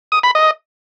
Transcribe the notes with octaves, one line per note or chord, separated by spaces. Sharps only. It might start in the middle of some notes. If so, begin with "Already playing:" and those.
D#6
B5
D#5